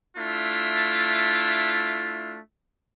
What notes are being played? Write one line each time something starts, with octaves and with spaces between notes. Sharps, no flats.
A3 D4 E4 F4